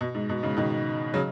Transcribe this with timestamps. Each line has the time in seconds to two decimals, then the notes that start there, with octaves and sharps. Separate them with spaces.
0.01 B2
0.15 G#2
0.29 B2
0.43 G#2 C#3
0.57 B2 D#3
1.14 C#3 F#3